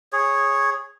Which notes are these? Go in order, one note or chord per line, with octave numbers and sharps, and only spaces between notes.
G#4 C#5